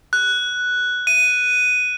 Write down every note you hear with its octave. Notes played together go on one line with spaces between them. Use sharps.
F#6
D#7